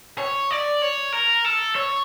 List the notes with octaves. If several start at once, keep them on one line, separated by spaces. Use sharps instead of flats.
C#5
D5
C#5
A#4
A4
C#5